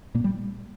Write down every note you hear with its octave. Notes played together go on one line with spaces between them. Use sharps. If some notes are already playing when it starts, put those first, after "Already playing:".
A#2 A#3
G3